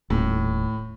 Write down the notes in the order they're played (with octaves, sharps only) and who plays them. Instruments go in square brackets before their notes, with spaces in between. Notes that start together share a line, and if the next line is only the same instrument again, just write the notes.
[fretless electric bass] D#1 [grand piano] A2